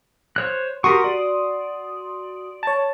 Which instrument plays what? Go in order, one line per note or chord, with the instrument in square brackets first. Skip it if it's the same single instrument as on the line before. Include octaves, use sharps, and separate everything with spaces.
[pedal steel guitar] C5 C#5 F#6
[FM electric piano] F#4 C6 D#6 [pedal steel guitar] G4 A#4 C#6
[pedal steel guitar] D5
[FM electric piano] C#5 A5